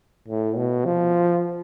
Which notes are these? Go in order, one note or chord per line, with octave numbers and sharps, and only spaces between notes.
A2
B2
F3